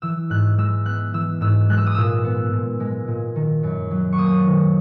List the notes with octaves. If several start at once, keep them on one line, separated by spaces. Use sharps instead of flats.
E3 E6
G#2 F#6
G#3 E6
B3 F#6
E3 E6
G#2 E6
G#3 F#6
E6
D#6
A#2 E6
B3
A#2
G#3
A#2
D#3
F#2
F#3
C#6
A#3 D#6
D#3